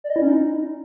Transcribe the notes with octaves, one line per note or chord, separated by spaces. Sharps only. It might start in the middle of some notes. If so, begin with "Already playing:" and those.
D5
D#5
E4
C#4
D#4